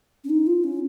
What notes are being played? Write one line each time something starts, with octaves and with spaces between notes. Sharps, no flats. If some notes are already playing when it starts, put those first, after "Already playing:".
C#4
D#4
F4
C#4